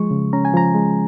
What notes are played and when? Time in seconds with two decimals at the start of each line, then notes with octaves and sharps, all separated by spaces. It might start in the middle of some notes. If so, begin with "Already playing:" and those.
Already playing: F3 G#3 C#6
0.11 C#3
0.33 C#4 A#5
0.45 G#5
0.54 F3 A#5
0.75 G#3